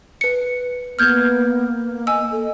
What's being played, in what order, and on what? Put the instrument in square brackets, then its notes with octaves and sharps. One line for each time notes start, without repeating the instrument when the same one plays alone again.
[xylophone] B4 C#7
[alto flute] A#3 [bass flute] B3 [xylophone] F6 G6 G#6
[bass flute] D#5 [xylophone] G#5 E6
[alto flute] A4